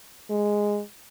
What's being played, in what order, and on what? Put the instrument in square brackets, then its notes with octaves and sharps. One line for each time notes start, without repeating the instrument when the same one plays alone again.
[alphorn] G#3